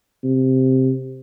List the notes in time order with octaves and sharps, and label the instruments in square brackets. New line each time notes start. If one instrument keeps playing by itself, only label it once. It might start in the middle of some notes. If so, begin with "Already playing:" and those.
[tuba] C3